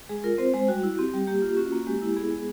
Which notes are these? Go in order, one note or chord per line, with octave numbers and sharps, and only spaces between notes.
G#3 G#4
F4 A#4
C4 C5
G#3 C5
G3 F#4
E4
C4 G4
G3
A#3 G4
F4
C#4 F#4
A#3
G#3 G4
E4
B3 G#4
G#3